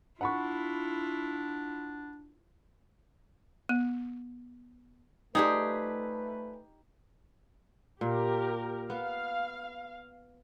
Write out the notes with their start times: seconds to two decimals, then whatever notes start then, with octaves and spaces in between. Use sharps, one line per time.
0.21 D4 E4 F4 F#5 B5 C#6
3.69 B3
5.35 F3 G3 A3 D#4 G4 G#4 B4
8.01 A#2 G4 A#4
8.90 B3 F5